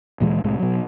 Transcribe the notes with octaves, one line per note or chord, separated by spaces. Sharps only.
D2 A#2 E3 G#3
C2 A2 C3 G#3
B2 F#3